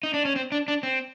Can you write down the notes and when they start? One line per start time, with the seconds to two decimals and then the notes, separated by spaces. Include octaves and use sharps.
0.03 D#4
0.14 D4
0.25 C#4
0.36 C4
0.52 D4
0.68 D4
0.83 C4